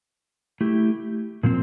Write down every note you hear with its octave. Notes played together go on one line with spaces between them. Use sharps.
A3 E4 G4
A#2 F3 C4